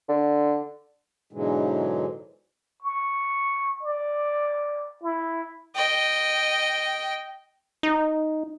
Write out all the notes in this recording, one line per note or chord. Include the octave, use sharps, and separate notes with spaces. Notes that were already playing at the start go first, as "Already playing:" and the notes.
D3
G#2 B2 D3 E3 F#3 G#3
C#6
D5
E4
D#5 G5
D#4